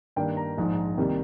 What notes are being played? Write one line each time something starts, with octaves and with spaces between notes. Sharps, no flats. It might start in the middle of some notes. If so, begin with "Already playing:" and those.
G2 D#3 A#3 D4 G5
A#5
A#1 G#2 F3
C2 C3 D#3 G3 A#3